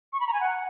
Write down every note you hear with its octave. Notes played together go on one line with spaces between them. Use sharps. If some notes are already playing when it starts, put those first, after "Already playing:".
C#6
B5
A#5
G#5
F#5